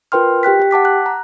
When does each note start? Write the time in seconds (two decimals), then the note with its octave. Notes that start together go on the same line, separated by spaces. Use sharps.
0.12 F4 A#4 B4 G5 C6 F6
0.43 G4 G5 F#6 B6
0.60 G4 G5
0.71 F#5 A5 D6 B6
0.85 F#6
1.06 A#5